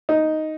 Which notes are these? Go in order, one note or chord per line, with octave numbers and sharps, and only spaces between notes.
D#4